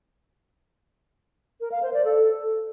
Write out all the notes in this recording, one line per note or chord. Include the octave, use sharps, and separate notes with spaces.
A#4
F5
C5
D5
A4